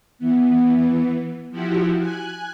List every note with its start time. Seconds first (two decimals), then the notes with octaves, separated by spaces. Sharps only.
0.19 E3 B3
1.50 F3 E4 F#4 G4
2.00 G#5 F#6